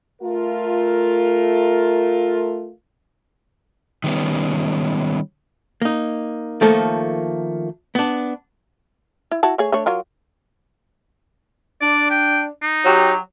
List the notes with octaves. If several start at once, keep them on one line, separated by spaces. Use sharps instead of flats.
A3 F4 A#4
D#3 G3 B3 C#4
A#3 D#4
D#3 F3 A3 A#3 A4
B3 D4
E4
E4 F#4 A5
A3 G#4 C#5
A3 D4 C#5
F#3 F4 A#4
D4 D5
G5
D#4
F#3 G4